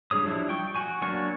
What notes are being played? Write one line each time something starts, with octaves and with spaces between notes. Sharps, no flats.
G3 D4 G#4 C#5 D#6
F3 G3 D4 E4
G5 C#6
F#4 G#5 C#6
F#3 A#3 D4 C#6